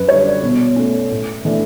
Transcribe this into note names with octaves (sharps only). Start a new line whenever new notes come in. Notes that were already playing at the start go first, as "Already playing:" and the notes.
Already playing: F#2 B4
D3 G3 C#5
D5
B2
A3 C#4
A2
E3 A3 D4